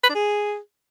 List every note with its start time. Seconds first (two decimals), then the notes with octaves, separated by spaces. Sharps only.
0.04 B4
0.09 D4
0.15 G#4